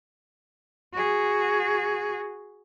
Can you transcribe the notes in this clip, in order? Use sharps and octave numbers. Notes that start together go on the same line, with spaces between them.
F#4 G#4